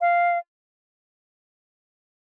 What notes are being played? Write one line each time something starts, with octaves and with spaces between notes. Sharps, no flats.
F5